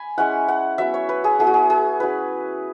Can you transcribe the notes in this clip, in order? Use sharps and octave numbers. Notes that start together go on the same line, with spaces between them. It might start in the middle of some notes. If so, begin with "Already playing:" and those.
Already playing: G#5 B5
G#3 C#4 E4 F#5
F#5
F#3 B3 E4 E5
C#5
B4
G#4
F#3 B3 E4 G#4
F#4
G#4
G#4
F#3 C#4 E4 B4